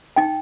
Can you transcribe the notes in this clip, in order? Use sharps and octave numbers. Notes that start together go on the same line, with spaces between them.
D#4 G5